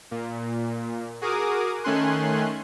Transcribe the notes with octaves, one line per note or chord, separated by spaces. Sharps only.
A#2
F#4 G#4 A#4 D6 D#6
D#3 A3 C#4 G#5 C6 F#6